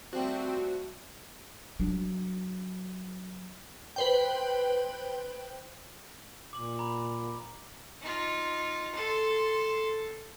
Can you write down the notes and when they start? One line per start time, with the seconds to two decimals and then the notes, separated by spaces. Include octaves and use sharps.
0.13 F3 G3 A3 C4 F#4
1.79 F#3 D4
3.96 B4 C5 G5
6.53 A#2 D6 F#7
6.79 A#5 B5
8.02 D#4 F4
8.95 A4 C6